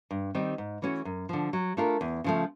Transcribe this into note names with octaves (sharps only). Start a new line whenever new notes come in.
G2
D#3 G3 C4 D#4
G#2
E3 A3 C#4 F#4
F#2
D3 F3
F#3
A3 D4 F4 A#4
E2
C#3 F3 A3